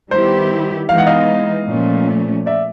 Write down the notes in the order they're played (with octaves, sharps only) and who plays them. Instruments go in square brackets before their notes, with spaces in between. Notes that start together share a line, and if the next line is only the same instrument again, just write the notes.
[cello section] D#3 G3 B3 E4 G4 [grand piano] C5
[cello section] E3 G#3 B3 D#4 [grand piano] F5
[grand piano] F#5
D#5 F5
[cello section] A#2 F3 A3 C#4
[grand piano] D5 E5